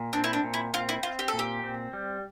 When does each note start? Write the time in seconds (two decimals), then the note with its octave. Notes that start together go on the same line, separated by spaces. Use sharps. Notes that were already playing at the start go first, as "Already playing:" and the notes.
Already playing: A#2
0.13 C4 D4
0.24 E4
0.33 D4
0.44 A#2
0.54 E4
0.74 C4 F4
0.89 E4
1.03 C4 F4
1.19 G4
1.28 A4
1.33 A#2
1.39 G4
1.63 C4
1.93 G3